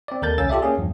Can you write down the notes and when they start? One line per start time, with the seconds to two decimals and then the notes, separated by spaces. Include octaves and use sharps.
0.08 C4 D5
0.22 D#2 A4 A#4 G6 A6
0.38 C2 C#4 F5 E6 A6
0.49 F4 G4 A4 D5 E5
0.62 A#3 C#4 G#4
0.78 E2 G2 F3